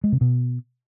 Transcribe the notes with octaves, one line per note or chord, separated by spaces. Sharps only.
G#3
C3
B2